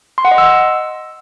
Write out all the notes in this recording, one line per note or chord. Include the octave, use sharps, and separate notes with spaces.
C6
F#5
D#5
E6